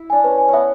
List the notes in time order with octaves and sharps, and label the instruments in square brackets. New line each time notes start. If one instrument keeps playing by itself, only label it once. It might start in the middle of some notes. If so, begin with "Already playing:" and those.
Already playing: [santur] E4
[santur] D4 [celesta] G#5
[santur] C#4 [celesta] B4
[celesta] G#5
[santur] B3 C#4 [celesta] E5